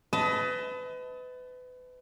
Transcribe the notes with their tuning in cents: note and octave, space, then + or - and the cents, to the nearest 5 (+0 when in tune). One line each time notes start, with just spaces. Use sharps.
B4 +30 D#5 +30 A5 +0